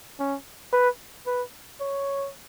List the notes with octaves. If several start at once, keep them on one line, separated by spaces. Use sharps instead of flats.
C#4
B4
B4
C#5